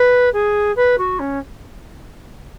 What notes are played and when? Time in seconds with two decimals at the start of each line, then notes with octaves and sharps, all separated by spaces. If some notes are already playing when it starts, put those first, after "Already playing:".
Already playing: B4
0.33 G#4
0.76 B4
0.98 F#4
1.20 C#4